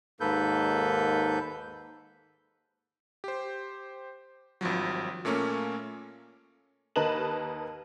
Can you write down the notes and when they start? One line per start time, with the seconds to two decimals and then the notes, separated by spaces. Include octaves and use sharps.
0.20 D#2 G#2 A#3 A4 B4 G6
3.24 G4 C5
4.61 G#1 G2 F3 F#3
5.25 A#2 A3 A#3 C#4
6.96 D#2 A#4 B4 D#5 A5 F#7